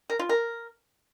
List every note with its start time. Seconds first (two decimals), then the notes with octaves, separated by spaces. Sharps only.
0.10 A#4
0.19 F4
0.29 A#4